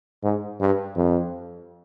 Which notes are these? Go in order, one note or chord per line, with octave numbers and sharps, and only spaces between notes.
G#2
G2
F2